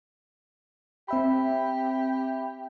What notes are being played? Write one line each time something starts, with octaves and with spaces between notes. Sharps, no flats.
C4 G4 E5 B5